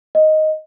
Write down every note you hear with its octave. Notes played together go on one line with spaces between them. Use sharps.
D#5